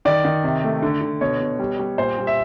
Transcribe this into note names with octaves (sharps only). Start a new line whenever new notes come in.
D#3 D5
D#3
C3
A3
D3
D3
B2 C#5
B2
G3
G3
A#2 C5
G3
E5